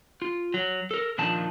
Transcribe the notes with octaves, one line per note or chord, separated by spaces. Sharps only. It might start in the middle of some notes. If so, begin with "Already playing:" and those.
F4
F#3
A4 A#4
A#2 D#3 F3 D4 F4 A5